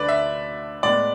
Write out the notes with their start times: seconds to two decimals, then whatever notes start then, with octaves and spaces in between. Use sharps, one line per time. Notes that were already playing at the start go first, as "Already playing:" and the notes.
Already playing: D2 D3 A3 B4 D5
0.09 E5
0.83 A2 G#3 B3 D5